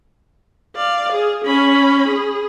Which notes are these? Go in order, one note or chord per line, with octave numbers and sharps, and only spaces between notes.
D5 F5
G#4
C#4 B5
G#4